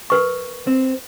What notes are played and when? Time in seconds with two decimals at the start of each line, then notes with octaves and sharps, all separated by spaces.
0.10 A#4 B4 C#6
0.67 C4